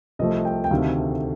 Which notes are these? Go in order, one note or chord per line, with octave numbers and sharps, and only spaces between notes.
C2 C3 F3 A3 D#5
G5
G5
D2 C3 D#3 A3 F5